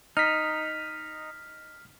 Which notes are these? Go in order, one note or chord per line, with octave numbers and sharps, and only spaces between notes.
D#4 F6 B6